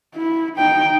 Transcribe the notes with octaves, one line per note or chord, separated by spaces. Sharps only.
E4
D#4 G5